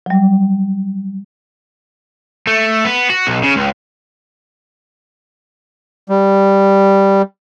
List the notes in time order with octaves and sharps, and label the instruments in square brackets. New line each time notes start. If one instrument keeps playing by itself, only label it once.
[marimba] F#3 G3
[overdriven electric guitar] A3
B3
F#4
B1
C#3
C#2
[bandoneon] G3